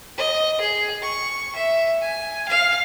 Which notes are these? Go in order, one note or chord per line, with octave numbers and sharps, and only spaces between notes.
D#5
G#4
C#6
E5
G#5
F5